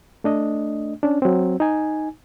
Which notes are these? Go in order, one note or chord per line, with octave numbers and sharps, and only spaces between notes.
A3 D4 D#5
C#4 D4
F#3 C4
D#4 G#5